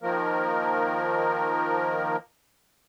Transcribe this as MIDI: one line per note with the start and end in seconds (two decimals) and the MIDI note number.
0.03 2.16 51
0.03 2.16 53
0.03 2.16 58
0.03 2.16 70